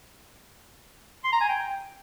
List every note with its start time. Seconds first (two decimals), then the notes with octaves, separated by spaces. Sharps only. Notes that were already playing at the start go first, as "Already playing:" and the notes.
1.24 C6
1.33 A#5
1.41 G#5
1.49 G5